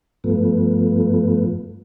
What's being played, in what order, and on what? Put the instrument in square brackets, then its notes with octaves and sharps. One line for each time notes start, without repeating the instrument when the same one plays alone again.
[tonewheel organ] G2 F3 A3 B3